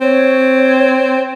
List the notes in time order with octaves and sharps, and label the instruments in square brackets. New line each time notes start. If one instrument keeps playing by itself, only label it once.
[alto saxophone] C4 [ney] C#5